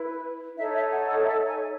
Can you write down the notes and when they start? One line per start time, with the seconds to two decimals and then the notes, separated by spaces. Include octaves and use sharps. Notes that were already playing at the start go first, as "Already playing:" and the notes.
Already playing: E4 B4
0.58 D#4 A4 C#5 E5
0.75 E5
0.90 F#5
1.08 F#5
1.24 E5
1.46 G#5